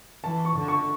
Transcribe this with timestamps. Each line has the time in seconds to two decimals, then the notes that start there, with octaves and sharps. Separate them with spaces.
0.24 E3 A5
0.45 C#6
0.56 D3
0.68 C#6